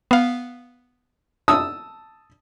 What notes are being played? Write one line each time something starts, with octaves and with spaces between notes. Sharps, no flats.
B3 F5
A5 D#6 E6